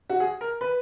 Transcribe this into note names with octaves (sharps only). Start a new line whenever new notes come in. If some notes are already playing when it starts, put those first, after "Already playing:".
F#4
G#4
A#4
B4